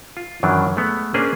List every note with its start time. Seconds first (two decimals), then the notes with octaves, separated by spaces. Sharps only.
0.17 F4
0.43 F#2 D#3 E3 F#3 D4
0.76 G#3 A3 B3
1.14 A#3 C#4 D4 G#4 B4 C5